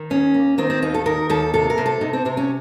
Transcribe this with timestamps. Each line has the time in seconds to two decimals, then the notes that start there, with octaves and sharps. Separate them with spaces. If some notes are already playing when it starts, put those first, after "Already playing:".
Already playing: D#3
0.10 D#2 C#4
0.34 A#3
0.58 D#3 C4
0.70 C4
0.82 D#2 D#4
0.94 A4
1.06 D#3 A#4
1.30 D#2 A4
1.54 C3 A4
1.70 A#4
1.78 C3
1.86 A4
2.01 C3 D#4
2.13 C4
2.25 C3 C4
2.37 C#4